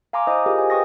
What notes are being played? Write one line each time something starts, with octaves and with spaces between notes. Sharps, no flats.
F5 G#5 A#5 C6 D6
E4 C5 D#5 F5 D#6
F4 G4 G#4 A#4 D#5 F5
C5 G#5
B4 D#5 G5 C#6 D#6 A#6